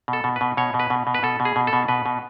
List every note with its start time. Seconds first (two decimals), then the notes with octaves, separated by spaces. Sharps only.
0.08 B2
0.13 A4
0.24 B2
0.36 B2 B4
0.57 B2 C#5
0.74 B2
0.79 B4
0.90 B2
1.07 B2
1.14 B4
1.23 B2 A4
1.40 B2
1.45 G#4
1.56 B2
1.67 A4
1.73 B2
1.88 B2 B4
2.06 B2